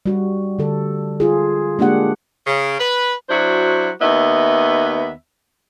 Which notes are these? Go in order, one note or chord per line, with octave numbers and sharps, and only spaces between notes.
G3 F#4
D3 A4
F4 G#4
G#3 A#3 D4 G4 F#5
C#3
B4
F#3 D4 E4 F#4 C5
D#2 B3 D#5 E5